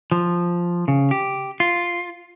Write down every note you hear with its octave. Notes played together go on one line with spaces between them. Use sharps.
F3
C#3
G4
F4